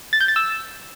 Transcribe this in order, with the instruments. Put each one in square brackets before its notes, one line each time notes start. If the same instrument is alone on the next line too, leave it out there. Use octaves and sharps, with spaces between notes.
[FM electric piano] A6
G6
A6
E6